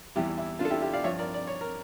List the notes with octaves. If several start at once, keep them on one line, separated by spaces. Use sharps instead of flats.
E2 E3 G3 E4 G4
E4
D4 F4
A4
E4 G4
E4 G4
D5 F5
G2 F3 C#5 E5
A#4 D5
D5
C#5
A#4